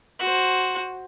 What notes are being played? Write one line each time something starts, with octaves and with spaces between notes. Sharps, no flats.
F#4 C5